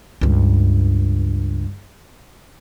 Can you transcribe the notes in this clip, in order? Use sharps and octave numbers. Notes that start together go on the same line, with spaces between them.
C#2 G2